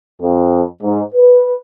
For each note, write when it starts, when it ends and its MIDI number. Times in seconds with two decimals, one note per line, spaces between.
0.21 0.61 41
0.83 1.02 44
1.14 1.54 71